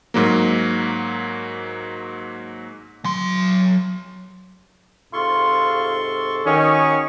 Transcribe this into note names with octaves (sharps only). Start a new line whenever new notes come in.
G#2 F#3 A#3
F#3 C6
G#2 C3 F4 A4 C6 C#6
D#3 C#4 F#4 G#4 D#5 C#6